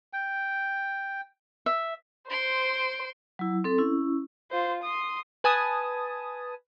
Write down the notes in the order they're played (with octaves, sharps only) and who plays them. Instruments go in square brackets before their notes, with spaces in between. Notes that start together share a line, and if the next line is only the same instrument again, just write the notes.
[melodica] G5
[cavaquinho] E5
[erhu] C5 [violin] C6 D7
[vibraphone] F#3 E4
C4 A4
C#4 E4
[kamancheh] F4 C5
C6 D#6
[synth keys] B4 G#5 A5 D#6